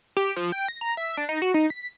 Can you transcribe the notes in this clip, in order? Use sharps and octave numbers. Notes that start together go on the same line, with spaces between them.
G4
F3
G5
A#6
A#5
E5
D4
D#4
F#4
D#4
B6